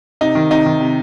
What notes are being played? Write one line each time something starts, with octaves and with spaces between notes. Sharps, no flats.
C3 D#4
D#3
C3 D#4
D#3
C3